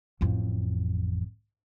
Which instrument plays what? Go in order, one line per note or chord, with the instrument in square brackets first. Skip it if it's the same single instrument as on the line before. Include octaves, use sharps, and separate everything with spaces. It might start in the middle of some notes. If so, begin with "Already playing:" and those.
[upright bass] A1 F2